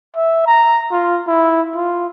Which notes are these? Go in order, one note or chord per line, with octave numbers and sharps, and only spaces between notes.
E5
A#5
F4
E4
F4